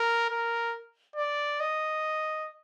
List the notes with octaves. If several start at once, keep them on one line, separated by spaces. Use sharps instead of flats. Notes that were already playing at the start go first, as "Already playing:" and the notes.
Already playing: A#4
A#4
D5
D#5